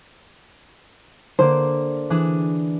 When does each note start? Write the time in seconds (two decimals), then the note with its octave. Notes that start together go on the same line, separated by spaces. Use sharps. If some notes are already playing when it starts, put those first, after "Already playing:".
1.39 D3 A#3 C5 D6
2.10 E3 D4 G#4